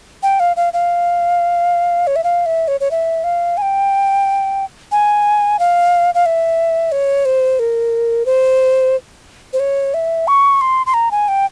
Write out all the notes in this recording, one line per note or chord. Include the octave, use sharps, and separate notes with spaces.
G5
F5
F5
F5
C#5
E5
F5
E5
C#5
C#5
E5
F5
G#5
G5
G#5
F5
F5
E5
C#5
C5
A#4
C5
C5
C#5
E5
C#6
C6
C6
A#5
G#5
G5